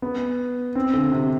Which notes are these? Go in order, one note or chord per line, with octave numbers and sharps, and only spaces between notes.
B3
C4
D3
C3